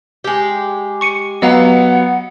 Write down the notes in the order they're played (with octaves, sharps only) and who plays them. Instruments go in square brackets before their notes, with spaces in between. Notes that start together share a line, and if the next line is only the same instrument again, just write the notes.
[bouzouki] G#3 G4
[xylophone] C#6 C#7 D#7
[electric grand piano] F#3 B3 [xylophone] D#5 F5 A#5 [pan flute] F#5